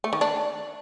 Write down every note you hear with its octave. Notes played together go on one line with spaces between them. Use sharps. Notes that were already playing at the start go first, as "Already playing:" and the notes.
A3
D#3
D4